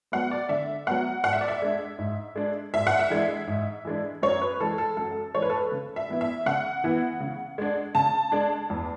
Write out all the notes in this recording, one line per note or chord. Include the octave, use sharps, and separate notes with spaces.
F#3 B3 F#5
D5
D3 E5
F#3 B3 F#5
G#2 F#5
E5
D5
E5
G#3 D4
G#2
G#3 D4
G#2 E5
F#5
E5
E3 G#3 D4
G#2
E3 G#3 D4
F#2 C#5
B4
E3 G#3 A4
A4
F#2 A4
E3 G#3 C#5
B4
A4
B4
C#3
E5
E3 B3 E4
E5
C#3 F#5
E3 B3 E4
C#3
G#3 D4
C#3 A5
G#3 D4
E2